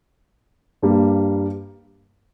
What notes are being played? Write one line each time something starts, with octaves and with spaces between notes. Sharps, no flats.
G2 G3 A#3